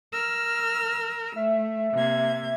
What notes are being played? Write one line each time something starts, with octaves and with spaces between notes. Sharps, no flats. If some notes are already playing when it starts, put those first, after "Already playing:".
A#4 E6 F6
A3 E5
C3 A#3 G#6